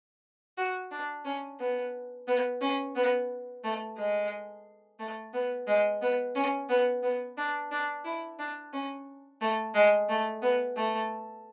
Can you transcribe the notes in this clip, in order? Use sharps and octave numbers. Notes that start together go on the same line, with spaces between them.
F#4
D4
C#4
B3
B3
C#4
B3
A3
G#3
A3
B3
G#3
B3
C#4
B3
B3
D4
D4
E4
D4
C#4
A3
G#3
A3
B3
A3